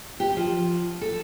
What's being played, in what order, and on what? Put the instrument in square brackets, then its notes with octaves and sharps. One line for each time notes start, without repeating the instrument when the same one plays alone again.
[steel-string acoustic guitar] G4
F3
A4